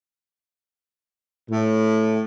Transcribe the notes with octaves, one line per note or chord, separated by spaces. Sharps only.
A2